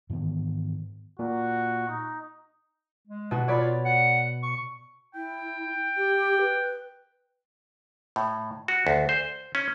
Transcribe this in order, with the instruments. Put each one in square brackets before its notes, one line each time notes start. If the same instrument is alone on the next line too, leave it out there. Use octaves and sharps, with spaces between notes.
[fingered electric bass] G#2 D#3 E3 B3
[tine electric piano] A#2 [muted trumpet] F#4
[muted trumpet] D#4
[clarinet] G#3
[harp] B2 F#4
[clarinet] F4 [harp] C#5 D5 B5
[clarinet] F#5
C#6
[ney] E4 [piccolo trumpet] G5
[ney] G4
B4
[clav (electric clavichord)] A2
F#4
D2
C5
C#4